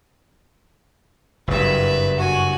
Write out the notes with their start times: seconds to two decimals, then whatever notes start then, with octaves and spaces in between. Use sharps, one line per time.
1.48 F#1 G2 B4 E5
2.17 F#4 G#5